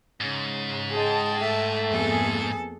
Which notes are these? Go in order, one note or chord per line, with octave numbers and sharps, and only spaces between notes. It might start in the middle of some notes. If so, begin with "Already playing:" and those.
G#2 C#3
G#3 G#4 G5 A5
A3 E5
F2 A#3 B3 G#4 A4